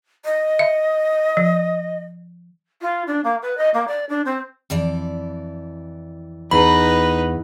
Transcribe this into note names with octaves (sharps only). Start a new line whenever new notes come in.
D#5
E5
F3
F4
D4
A#3
B4
D#5
A#3
D5
D4
C4
F2 E3 D5
E2 D#4 B4 B5